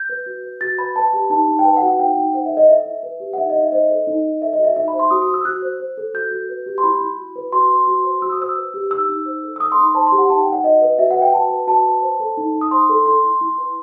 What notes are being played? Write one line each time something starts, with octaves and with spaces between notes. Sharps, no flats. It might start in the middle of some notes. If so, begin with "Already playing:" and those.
Already playing: G6
B4
F#4
B4
F#4 A6
B4 B5
B4 A5
G4
D#4 A5
D#4
G5
B4 A5
F#5
F#4
F#5
D#4 G5
D#4
C5 F#5
E5
A4
D#5
E4 E5
E4
B4
G4
F#5
D#4 E5
D#5
D#4
E5
C5 D#5
A4
D#4
D#4
A4 E5
D#5
F#4
E5
D#4 E5
B5
C5
C6
F#4 D#6
D#6
C5
E6
F#4 F#6
C5
C5
A4
F#4 G6
F#4
B4
G4
C6
E4 B5
E4
F#4
B4
F#4 C6
B4
F#4
C5
F#4 E6
D#6
C5 E6
B4
G4
D#4 E6
D#4
C5
A4
E6
D#4 D#6
C6
D#4
B5
C5 A5
C6
G4
F#5
D#4 A5
G5
D#4
F#5
F#4 D#5
B4
F#4 E5
F#5
B4
G5
F#4 A5
B4
F#4 A5
B4
C5
A4
D#4
D#4
D#6
C5 C6
A4
E4 C6
E4
E4
B4